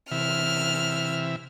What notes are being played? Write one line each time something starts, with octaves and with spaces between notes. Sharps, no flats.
C3 E3 E5 F6